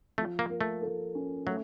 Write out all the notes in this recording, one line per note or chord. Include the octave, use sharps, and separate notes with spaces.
F3 A3
A#3
A#3
A3
A4
C#4
F#3 A3